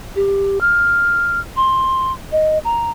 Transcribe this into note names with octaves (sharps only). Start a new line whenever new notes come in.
G4
F6
C6
D#5
A#5